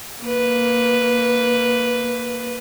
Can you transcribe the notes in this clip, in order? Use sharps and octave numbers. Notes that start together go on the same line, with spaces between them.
A#3 B4